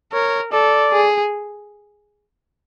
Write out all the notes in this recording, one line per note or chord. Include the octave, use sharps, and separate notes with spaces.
A#4 C#5
A4 D5
G#4